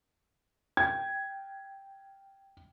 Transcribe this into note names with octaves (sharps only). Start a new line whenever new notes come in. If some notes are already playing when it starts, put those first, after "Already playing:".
G5 G#6